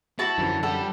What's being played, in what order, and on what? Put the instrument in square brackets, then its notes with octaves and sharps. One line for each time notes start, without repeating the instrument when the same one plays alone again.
[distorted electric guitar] E4 [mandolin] F#4 A5
[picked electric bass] F#2 D3 F3 [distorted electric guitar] E3
[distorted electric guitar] G3 [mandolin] A4 F#5